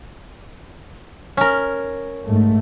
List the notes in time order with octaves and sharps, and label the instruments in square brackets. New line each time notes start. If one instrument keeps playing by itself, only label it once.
[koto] C#4 A#4
[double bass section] G#2 A3